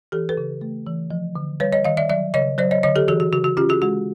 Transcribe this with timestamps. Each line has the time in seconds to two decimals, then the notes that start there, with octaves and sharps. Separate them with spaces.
0.12 E3 G4 A4
0.29 A4 B4
0.37 C#3
0.61 A3
0.86 E3
1.11 F3
1.35 D3
1.60 G3 B4 C#5
1.73 C#5 D#5
1.85 D#3 D#5 F5
1.97 D5 E5
2.09 F#3 D5 E5
2.34 C#3 C#5 D#5
2.58 F#3 C5 D5
2.71 C#5 D#5
2.83 D3 C#5 D#5
2.96 G4 A4
3.08 E3 F#4 G#4
3.20 F#4
3.33 C#3 F#4
3.44 F#4
3.57 C#4 F4 G4
3.69 F#4 G#4
3.82 G#3 F#4